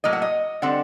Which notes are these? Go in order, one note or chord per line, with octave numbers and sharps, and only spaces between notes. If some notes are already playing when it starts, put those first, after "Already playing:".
A2 F#3 A#3 D#5
F#5
D#5
D3 G3 C4 F#5